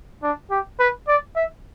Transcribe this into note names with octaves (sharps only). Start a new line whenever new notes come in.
D4
G4
B4
D5
E5